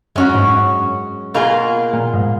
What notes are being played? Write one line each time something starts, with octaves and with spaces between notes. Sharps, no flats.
F#2 G#3 C#4 F#4
G#2
F#2
B2 A#3 F4 G#4
A#2
G#2